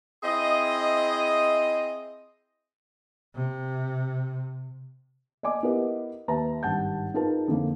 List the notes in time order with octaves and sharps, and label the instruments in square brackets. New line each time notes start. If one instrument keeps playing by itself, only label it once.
[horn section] C4 E4 G#4 D#5
[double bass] C3
[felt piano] D5 D#5 G#5 D6
B3 E4 G4 A#4 B4 D#5
D#2 B4 E5 A5 A#5
G#1 G2 F#5 A5 G6
D#4 F4 G#4 A#4 B4 A5
F2 D3 A3 A#3